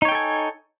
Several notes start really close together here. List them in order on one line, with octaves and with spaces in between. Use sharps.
D#4 C#5 G5 A4 G#5